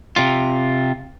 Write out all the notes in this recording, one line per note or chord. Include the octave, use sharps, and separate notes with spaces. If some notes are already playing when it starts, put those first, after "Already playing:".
C3 F4